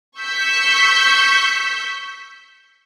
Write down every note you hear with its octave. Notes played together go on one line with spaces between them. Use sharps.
C#6 E6 G6 B6 C#7